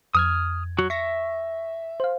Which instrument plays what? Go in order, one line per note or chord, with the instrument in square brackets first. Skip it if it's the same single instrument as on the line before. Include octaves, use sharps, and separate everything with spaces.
[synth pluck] F2 G#6 [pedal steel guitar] D#6 F6
[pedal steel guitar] F#3 F#4
[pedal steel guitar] E5 [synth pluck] C#6 A#6
[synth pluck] C5 F5